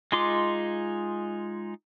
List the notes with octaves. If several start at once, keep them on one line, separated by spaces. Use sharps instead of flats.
G#3 D#4 F4 C6 D6